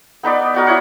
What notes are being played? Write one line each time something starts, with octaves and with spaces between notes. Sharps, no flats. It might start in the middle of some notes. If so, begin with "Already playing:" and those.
B3 D#4 B4 D5
B3 F#4 A#4
E4 C#5 F#5